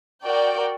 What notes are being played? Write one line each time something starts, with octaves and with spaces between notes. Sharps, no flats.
F#4 A#4 D5 G5